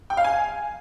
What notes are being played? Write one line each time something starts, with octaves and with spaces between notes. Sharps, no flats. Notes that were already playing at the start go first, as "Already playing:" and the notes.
G5
F5
G#5